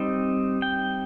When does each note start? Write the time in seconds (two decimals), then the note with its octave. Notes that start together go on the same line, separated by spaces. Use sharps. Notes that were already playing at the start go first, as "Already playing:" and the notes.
Already playing: G3 C4 D#4
0.62 G5